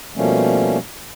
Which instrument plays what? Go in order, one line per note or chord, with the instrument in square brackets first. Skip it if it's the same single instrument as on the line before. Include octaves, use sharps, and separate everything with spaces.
[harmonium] B2 F3 G3 A3 A#3 C#4